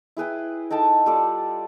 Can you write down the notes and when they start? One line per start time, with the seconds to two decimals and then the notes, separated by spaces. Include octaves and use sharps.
0.17 E4 G#4 B4 G5
0.70 D#4 A4 G5 A5
1.06 G3 F4 A4 D5